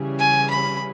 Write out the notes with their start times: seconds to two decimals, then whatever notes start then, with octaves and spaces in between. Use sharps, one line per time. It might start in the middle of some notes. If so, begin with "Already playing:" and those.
Already playing: C#3 E3 G3 C#4 G#4
0.19 G#5
0.50 B5